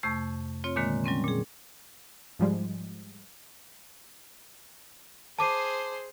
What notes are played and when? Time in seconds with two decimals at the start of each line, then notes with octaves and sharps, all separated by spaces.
0.03 F2 C3 A3 C#6 G6
0.64 C4 F4 C#5
0.76 A#2 D3 D#3 G#3 A#3
1.04 F#3 G3 C4 C#4
1.24 A#2 G#4
2.39 G#2 F3 G3 G#3
5.39 G#4 C5 A5 D6 D#7